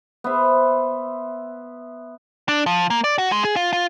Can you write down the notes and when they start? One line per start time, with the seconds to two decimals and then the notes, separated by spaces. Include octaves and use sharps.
0.24 B3 C5 E5
2.48 D4
2.66 F3
2.90 A#3
3.04 D5
3.18 F#4
3.32 G#3
3.45 G#4
3.56 F4
3.73 F4